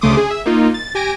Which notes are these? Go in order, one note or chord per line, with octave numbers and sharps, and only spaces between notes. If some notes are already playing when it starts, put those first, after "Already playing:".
D2 C#3 A3 C6 D6 D#6
G#4
E5
A#3 D#4 F4
A6
G4 G#5 A#6 D7